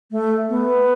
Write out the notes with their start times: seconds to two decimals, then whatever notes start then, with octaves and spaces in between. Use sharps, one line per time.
0.11 A3
0.49 B3